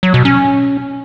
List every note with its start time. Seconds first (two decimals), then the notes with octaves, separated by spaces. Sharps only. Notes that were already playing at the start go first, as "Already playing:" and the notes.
0.03 F#3
0.14 B2
0.25 C#4